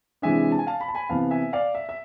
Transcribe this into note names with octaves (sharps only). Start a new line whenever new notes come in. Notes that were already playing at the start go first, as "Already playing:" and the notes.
C3 E3 G#3 D4 E5 G#5
A5
G#5
F5 A5
B5
A5
G#5 B5
C3 E3 B3 F5 A5
E5 G#5
D5 F5
E5
E5